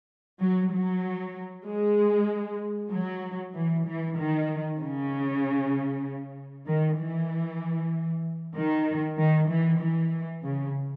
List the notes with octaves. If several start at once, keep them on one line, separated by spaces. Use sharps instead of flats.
F#3
F#3
G#3
F#3
E3
E3
D#3
C#3
D#3
E3
D#3
D#3
E3
E3
C#3